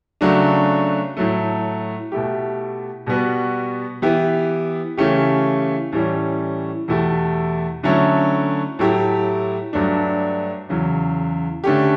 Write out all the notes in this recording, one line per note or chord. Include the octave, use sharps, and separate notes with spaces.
C#3 F#3 A3 D4 F#4
A2 F#3 A3
B2 A3 E4 G4
B2 G3 B3 F#4
E3 B3 E4 G4
C#3 E3 A3 C#4 G4
A2 E3 G3 C#4
E2 B2 A3 E4 G4
D3 F#3 A3 C#4 E4
A2 F#3 A3 E4 G4
G2 F#3 A3 D4
E2 C#3 F#3
D3 A3 C#4 G4